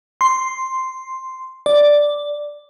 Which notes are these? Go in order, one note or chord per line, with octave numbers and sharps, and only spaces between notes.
C6
D5